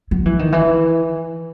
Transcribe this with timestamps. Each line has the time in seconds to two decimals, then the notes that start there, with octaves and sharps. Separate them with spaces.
0.11 F#3
0.25 E3
0.39 D#3
0.52 E3